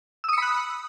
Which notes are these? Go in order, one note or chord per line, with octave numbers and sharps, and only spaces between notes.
B5 D#6 E6 F#6 C#7